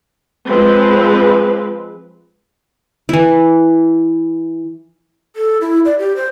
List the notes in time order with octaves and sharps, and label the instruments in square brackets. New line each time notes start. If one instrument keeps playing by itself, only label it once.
[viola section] F3 G#3 C4 B4
[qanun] E3 E4
[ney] A4
E4
D5
G4
C5